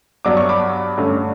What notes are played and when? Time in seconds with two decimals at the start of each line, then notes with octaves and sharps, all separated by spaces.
0.25 G2 F#3 B3 D4 D6
0.37 C#6
0.49 B5 D6
0.98 G2 D3 A3 C#4